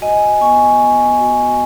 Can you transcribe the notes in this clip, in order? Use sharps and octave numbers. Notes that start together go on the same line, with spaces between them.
F#4 D#5 G#5
B3 G#5 C#6
B3
F#4